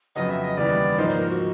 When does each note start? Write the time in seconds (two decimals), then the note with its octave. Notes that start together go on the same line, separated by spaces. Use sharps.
0.16 F2 C#3 F#3 B3 D#5
0.29 E5
0.43 D#5
0.57 D#2 C#3 E3 G3 B3 D5
0.98 G#2 F3 A#3 D#4 C5
1.09 C5
1.20 A#4
1.29 F#4